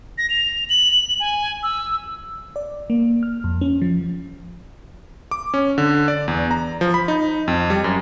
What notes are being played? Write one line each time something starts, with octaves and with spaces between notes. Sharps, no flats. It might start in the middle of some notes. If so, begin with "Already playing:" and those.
A#6
F7
F#7
G#5
E6
D5
A#3
F6
F2
C#4
F3
D6
C#4
D3
D5
E2
A#5
F3
B5
D#4
F2
G3
F#2